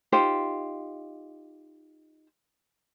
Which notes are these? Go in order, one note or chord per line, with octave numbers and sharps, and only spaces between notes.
D#4 F4 G4 C5